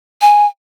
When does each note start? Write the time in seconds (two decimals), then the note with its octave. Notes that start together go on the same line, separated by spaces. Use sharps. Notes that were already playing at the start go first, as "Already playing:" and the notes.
0.21 G#5